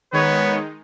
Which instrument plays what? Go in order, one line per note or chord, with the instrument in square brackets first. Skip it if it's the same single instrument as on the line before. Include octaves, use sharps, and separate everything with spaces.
[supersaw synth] D#3 G#3 D#4 [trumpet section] B3 B4 C#5